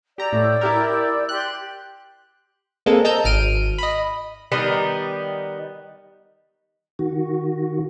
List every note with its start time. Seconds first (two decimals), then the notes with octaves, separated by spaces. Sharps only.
0.18 G4 D5 A#5 E6 G6
0.33 A2
0.61 E4 G4 A#4
1.29 G4 C6 F#6
2.86 G#3 A#3 C4 A4
3.05 D#5 A5 A#5 E6 G6
3.24 G#1 F6 D7 D#7
3.78 D#5 B5
4.52 D#3 G3 B3 D#4
6.99 D#3 F#4